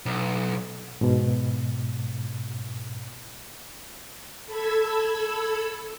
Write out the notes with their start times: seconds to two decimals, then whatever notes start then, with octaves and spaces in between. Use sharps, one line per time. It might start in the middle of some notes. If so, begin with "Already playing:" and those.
0.06 B1
1.01 G#2 B2
4.46 A4 B5 E6 G#6